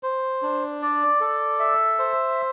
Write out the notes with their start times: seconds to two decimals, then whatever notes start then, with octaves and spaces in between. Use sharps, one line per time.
0.03 C5
0.42 D4
0.82 D5
1.21 A4
1.60 E5
1.99 C5